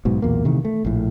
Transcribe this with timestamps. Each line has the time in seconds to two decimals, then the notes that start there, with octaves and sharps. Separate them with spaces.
0.05 B1 G#2 B2
0.22 B1 E2 A#2 A#3
0.45 C3 D#3 E3 A3
0.65 A3
0.85 A#1 A2